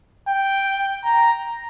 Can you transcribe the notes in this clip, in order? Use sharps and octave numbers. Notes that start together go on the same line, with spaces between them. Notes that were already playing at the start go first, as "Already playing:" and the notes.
G5
A#5